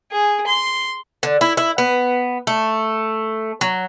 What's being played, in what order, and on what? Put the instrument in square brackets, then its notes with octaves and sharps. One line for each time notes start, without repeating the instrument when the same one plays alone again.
[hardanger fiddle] G#4
C6
[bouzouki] D3
E4
E4
B3
A3
F#3